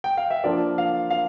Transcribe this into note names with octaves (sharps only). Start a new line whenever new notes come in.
G5
F5
E5
F3 A#3 D4 F4 D5
F5
F5